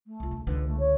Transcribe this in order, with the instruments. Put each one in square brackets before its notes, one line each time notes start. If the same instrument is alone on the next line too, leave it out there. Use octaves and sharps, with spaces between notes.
[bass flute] A3
[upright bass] C2 F4
D2
[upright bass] C#2 D3 [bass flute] B4
[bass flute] A3
C#5